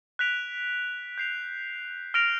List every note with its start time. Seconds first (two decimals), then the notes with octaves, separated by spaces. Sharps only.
0.19 F#6 B6 D7 F7
1.18 G6 C7 F7
2.14 F6 A#6 D7 F7